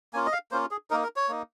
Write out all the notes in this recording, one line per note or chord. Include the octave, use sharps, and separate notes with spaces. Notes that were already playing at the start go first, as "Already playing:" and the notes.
A#3 C#4 F4 G#5
D#5
F5
A#3 C#4 F4 C5
G#4
A#3 D#4 A#4
A#4
C#5
A#3 D#4